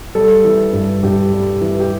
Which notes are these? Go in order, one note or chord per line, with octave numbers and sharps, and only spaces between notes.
G3 A4
E3
G2
G2 G4
G3
E3
G4